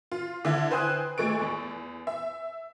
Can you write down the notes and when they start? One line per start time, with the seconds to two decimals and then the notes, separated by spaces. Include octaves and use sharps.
0.12 F4
0.45 D3 E4 E5
0.71 B4 C5 G5 G#5 D#6 F#6
1.18 A#2 G#3 A3 C#6 D7
1.41 E2
2.07 E5